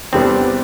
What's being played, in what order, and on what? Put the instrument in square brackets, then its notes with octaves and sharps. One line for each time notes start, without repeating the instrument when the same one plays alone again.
[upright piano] E2 C3 G3 B3 D4 [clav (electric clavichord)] C4